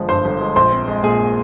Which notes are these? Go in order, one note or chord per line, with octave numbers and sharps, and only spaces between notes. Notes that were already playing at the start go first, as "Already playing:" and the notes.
Already playing: G1 F3 G#3
G2 C5 C6
G1
G#3
A#1 C5 C6
C4
G#3
A#2 G#4 G#5